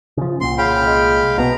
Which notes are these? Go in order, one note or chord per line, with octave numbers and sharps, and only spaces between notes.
C#3 F3
C2 A#2 C6
C#3 F5 G5 B5
G#3
B1 B3 F#4 A#5